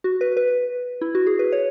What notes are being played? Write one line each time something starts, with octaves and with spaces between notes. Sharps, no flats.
F#4
B4
B4
E4
F#4
G#4
B4
C#5